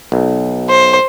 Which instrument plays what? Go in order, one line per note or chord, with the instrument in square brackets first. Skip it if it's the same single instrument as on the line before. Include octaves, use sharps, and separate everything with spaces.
[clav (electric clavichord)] B1
[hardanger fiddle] C5